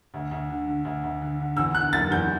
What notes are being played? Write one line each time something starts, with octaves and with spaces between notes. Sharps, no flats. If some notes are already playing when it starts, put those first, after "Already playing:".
D2
D2
D3
D3
D2
D2
D3
D3
E2 E6
D3 F#6
F#1 A6
E2 G6